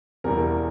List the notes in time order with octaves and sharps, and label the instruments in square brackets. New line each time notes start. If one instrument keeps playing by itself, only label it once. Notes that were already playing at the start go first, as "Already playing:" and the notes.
[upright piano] E1 E2 E3 G3 A#4